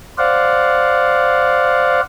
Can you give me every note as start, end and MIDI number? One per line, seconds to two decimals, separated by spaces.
0.18 2.01 72
0.18 2.01 74
0.18 2.01 77
0.18 2.01 78